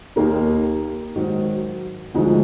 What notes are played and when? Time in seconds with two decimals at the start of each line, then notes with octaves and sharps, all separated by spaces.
0.16 D#2 D#3 A#3 D#4
1.16 G#2 D#3 F#3
2.14 D2 D3 F3 G#3 D#4